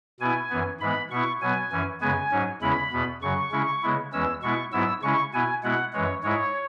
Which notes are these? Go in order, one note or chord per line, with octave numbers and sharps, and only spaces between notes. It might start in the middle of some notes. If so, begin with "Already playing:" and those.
B2 B3 E4 G#5
F#2 E3 B3
G#2 E3 G#3 B3 B5
B2 B3 E4 C#6
B2 F#3 B3 G#5
F#2 E3 C#4
F#2 C#3 G#3 B3 G#5
G#2 F#3 C#4
E2 C#3 G#3 C#4 E4 B5
E2 B2 B3
F#2 C#3 F#3 C#6
C#3 G#3 C#4 E4
C#3 G#3 B3 E4
E2 E3 G#3 C#4 E6
B2 G#3 B3 E4 C#6
G#2 F#3 B3 E4 E6
C#3 G#3 C#4 E4 C#6
B2 B3 E4 G#5
B2 G#3 B3 E4 F#5
F#2 E3 G#3 C#5
G#2 G#3 E4 C#5